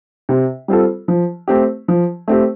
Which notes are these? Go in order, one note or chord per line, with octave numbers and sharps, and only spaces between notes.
C3
G3 C4 F4 A4
F3
A3 C4 G4
F3
A3 C4 G4